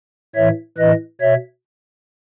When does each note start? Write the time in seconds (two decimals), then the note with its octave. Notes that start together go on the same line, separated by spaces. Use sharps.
0.35 A2 E3 C#5 E5
0.77 A2 E3 B4 D#5
1.21 B2 C#5 E5